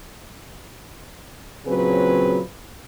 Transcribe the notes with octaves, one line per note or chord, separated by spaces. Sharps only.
A#2 C#3 F#3 C4 G#4 B4